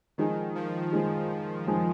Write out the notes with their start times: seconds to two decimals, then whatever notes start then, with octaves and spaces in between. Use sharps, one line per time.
0.18 D#3 F3 G#3 D#4 G#4
0.55 F3
0.92 D#3 F3 G#3 D#4 G#4
1.67 F3 G#3 D#4 G#4